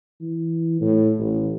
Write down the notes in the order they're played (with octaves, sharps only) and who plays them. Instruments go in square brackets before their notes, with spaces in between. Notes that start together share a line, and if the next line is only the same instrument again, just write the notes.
[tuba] E3
A2
A1